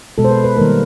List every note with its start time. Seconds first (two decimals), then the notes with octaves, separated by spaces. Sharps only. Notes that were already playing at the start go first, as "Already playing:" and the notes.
0.18 B2 G#3 A4
0.24 C5
0.31 B4
0.44 B4
0.57 D#3 G3 A#3 A#4